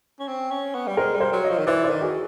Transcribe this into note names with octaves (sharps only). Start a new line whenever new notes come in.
C#4
C4
C#4
B3
G3
G#3 A#4 C5
G3
A#4 C5
F#3
C#5 D#5
F3
D#3
E3 C5 D5
C5 D5
D#3
F#4 G#4